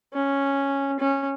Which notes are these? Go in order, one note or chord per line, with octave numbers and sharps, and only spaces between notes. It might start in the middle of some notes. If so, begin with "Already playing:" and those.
C#4
C#4